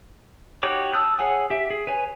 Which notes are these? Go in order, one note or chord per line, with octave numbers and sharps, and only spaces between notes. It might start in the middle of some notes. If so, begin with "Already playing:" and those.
D#4 F#4 G4 C#5 D6
A5 D#6 E6 F#6 G6
G#4 C#5 F#5 G#5
G4 E5
G#4
B4 C#5 G#5